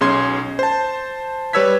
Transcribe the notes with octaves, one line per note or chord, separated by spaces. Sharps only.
B1 C#4 G#4 C6 G#6
C5 A5
G3 B4 C#5 E6 G#6 B6